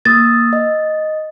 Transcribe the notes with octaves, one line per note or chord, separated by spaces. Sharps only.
A#3 D#6 E6 A6
D#5